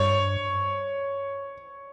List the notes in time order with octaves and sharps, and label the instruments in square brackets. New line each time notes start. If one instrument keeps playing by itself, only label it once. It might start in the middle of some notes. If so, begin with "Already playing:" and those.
Already playing: [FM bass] G2 [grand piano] C#5